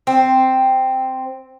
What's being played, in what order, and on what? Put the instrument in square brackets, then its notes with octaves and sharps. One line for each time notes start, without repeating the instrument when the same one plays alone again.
[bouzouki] C4